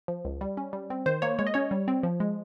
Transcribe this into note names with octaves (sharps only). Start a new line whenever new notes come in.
F3
C#2
G3
C#4
G3
C4
D#3 C5
A#3 C#5
G#3 C#5
D#5
C#4 C#5
G3
C4
F3
G#3